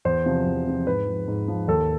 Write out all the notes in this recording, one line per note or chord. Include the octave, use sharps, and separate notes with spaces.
E2 C5
C3 F3
E2
C3 F3
G#2 B4
F3
G#2
F3
D#2 A4